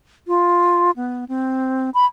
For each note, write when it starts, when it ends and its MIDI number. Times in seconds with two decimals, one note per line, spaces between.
0.27 0.91 65
0.96 1.25 59
1.29 1.90 60
1.94 2.06 83